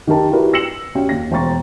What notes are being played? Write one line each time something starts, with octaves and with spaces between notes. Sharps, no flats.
D#3 G4 A#4 A5
D4 E4 F#4 G4 A#4 B4
E6 A#6 C7 C#7 E7 F#7
C#4 F#4 G4 G5
D#2 A#6
E1 C5 G5 A#5 C#6 A6